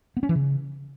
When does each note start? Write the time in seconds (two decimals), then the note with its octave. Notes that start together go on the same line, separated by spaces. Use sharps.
0.17 B3
0.23 C#4
0.29 E3
0.35 C#3